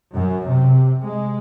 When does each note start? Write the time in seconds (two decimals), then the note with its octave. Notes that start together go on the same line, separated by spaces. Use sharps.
0.14 F#2
0.49 C3
1.01 G#3